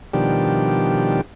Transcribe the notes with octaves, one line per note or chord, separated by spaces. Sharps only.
B2 D#3 F3 G3 D4 G4